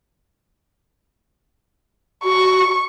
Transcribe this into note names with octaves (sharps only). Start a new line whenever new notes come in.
F#4 C#6